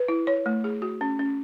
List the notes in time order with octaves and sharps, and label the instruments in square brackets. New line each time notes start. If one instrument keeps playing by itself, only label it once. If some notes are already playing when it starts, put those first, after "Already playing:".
Already playing: [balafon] B4
E4
C#5
A3
G#4
F#4
C#4
C#4